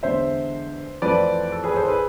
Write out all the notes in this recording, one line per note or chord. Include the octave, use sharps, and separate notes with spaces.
E2 D3 G#3 C5 E5
F2 E3 A3 C4 B4 D5
A4
G#4 B4
A4 C5
G#4 B4